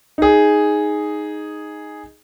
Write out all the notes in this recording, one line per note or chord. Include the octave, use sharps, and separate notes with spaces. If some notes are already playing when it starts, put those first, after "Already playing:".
D#4 G#4